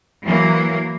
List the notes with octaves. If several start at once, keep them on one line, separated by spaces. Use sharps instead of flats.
E3 F#3 A#3